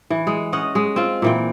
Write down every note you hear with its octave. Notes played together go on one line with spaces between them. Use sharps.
E3
G#3
C#4 D#5 F#5
G#3
C4 F4
A#2 E3 G5